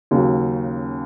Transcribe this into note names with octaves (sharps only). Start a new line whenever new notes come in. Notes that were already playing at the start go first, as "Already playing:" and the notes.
D#2 C#3 F#3